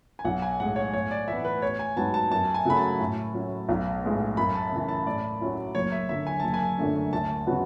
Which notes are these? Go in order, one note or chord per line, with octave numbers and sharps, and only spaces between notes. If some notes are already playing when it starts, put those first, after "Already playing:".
G#5
B1 F#5
G#5
A2 G#3 F#5
C#5
A2 C#5
D5
E3 B3 E5
B4
A1 C#5
G#5
G#2 F#3 B3 A5
A5
F#2 A5
G#5
C#3 F#3 A3 B5
A5
A2
F#3 C#4
B1
A2 G#3 B3
F#2 B5
A5
C#3 E3
A5
A2 D5
F#3 C#4 E4
F#1 C#5
E5
F#2 D3 E5
G#5
F#1 A5
G#5
F#2 D3 A3 D4
D2 A5
C#3 F#3 B3 F#4